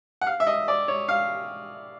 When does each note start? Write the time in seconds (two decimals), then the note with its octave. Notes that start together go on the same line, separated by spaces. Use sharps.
0.21 F#5
0.27 F5
0.40 E5
0.47 D#5
0.68 D5
0.88 C#5
1.08 F5